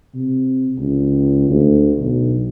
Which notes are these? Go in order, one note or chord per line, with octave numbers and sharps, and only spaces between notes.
C3
C#2
D2
B1